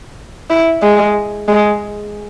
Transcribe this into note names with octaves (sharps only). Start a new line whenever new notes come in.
E4
G#3
G#3